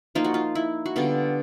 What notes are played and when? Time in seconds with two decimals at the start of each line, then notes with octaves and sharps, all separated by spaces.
0.15 F3 A#3 D#4 F4
0.24 F#4
0.34 F4
0.55 E4
0.86 F#4
0.96 D3 G3 B3 F4